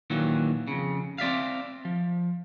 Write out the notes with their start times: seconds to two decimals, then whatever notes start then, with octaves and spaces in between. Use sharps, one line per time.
0.10 A#2 D#3 E3 F#3
0.67 F2 C#3
1.18 C4 D5 E5 F5
1.85 F3